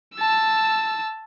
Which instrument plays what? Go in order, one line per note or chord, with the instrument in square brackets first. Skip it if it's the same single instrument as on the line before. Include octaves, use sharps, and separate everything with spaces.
[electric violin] A5 E6